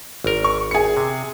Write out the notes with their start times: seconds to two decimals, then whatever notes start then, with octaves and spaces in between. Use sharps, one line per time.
0.24 G#1 A#4
0.44 C#6
0.71 G#4 C#7
0.97 C3